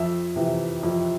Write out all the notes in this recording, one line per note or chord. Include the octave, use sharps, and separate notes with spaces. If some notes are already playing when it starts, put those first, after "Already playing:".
Already playing: F2 E5
C3 E3
F2